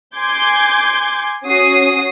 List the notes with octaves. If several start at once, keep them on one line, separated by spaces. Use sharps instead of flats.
G#5 C6 D6 G6 G#6
C#4 F#4 D#6 C7